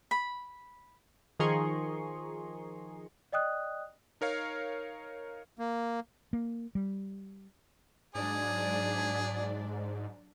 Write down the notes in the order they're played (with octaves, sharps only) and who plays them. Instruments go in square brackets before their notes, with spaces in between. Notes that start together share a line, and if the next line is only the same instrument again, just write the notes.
[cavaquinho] B5
[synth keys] D#3 F3 G#4 A#5 C6 C#6
[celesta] D5 D#5 G5 D#6 F#6
[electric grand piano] D#4 A#4 C#5 F5
[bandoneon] A#3
[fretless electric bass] A#3
G3
[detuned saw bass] G#2 [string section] F#3 D4 D5 [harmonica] G#4